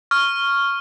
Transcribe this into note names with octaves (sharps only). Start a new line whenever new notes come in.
C#6 F6